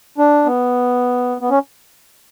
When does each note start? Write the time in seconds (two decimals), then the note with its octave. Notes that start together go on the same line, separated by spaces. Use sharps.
0.18 D4
0.46 B3
1.41 B3
1.50 C#4